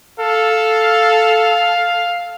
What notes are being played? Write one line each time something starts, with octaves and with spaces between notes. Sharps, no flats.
A4 F5